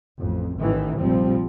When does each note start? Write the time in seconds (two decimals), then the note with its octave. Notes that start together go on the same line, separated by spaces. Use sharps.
0.19 A1 F2
0.58 A1 A2 D#3 E3
1.00 F1 A#1 F3 G3 C4